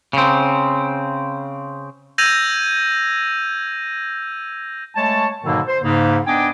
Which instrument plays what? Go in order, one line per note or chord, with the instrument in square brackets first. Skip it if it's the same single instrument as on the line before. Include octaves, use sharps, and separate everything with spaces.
[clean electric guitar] C#3 C4
[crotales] E6 G6 G#6 A#6 D#7 F7
[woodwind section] G#3 A3 C#5 A5
G#2 B2 D3 D#3 F#3 A#3
C5
G#2 C#3 A#3
B3 D4 D#5 G5 G#5 D6